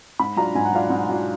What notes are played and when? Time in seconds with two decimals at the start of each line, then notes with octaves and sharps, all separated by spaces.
0.19 G#2 B5
0.37 F#3 D4 F4 A#5
0.55 G#2 G#5
0.65 F#5
0.72 F#3 D4 F4 F5
0.84 F#5
0.90 G#2
1.09 F#3 D4 F4